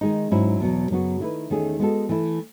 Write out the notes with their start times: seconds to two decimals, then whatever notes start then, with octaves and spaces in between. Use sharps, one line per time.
0.01 D#3 G#3 D#4
0.31 G#2 F#3 C#4 E4
0.60 E2 B2 F#3
0.90 F#2 C#3 F#3 B3 F#4
1.20 D#3 A3 E4 B4
1.50 E2 D#3 A3 C#4 G#4
1.79 G#3 B3 F#4 A4
2.09 E3 A3 E4